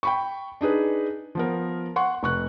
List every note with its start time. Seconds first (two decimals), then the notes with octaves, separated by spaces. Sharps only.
0.03 G5 B5 C#6
0.61 D4 D#4 G#4 B4
1.35 F3 B3 A#4
1.96 F#5 C6 C#6
2.23 F1 C#6 F#6